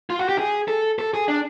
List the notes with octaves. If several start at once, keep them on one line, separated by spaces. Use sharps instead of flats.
F4
F#4
G4
G#4
A4
A4
G#4
D4